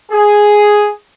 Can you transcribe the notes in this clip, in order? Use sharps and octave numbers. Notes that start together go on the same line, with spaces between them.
G#4